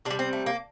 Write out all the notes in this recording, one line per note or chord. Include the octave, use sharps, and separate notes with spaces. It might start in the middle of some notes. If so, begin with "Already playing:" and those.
C3 D4
G3
C4
A3
A#3